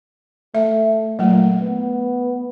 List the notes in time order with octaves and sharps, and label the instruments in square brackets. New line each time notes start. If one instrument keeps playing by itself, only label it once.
[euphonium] A3 [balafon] E5
[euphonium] A#2 [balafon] F#3 A3
[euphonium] B3